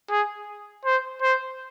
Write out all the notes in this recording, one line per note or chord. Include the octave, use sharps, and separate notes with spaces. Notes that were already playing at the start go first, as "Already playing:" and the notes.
G#4
C5
C5